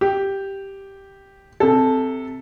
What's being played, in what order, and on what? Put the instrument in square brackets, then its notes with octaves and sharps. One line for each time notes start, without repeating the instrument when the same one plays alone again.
[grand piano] G4
C3 A4